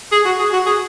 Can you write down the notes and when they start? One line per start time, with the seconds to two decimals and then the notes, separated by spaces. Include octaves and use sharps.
0.12 G#4
0.26 F#4
0.39 G#4
0.53 F#4
0.66 G#4